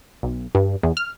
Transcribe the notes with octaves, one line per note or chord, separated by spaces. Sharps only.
B1
G2
E2
F6